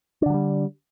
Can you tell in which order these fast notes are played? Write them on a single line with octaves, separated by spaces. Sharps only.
D4 D3 F#3 G3